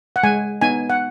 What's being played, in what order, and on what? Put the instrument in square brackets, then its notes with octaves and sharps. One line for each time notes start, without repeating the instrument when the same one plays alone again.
[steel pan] F#5
G#3 G#5
B3 D#4 G#5
F#5